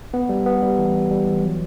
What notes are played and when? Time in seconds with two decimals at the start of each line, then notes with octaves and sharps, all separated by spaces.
0.14 B3
0.29 G3
0.46 B3
0.62 G3
0.78 E3
0.95 G3
1.11 G3
1.27 E3
1.43 F#3